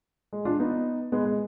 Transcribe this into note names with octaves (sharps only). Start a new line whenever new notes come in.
G#3
D4 F4
B3 D#4
G#3 B3
G#3